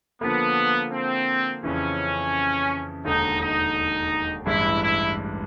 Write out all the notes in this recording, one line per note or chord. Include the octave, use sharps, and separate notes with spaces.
D3 F3 A#3 B3
C4
F2 C#3 E3 C#4
E1 D#2 D3 D#4
D#4
A1 G2 E3 G#3 E4
E4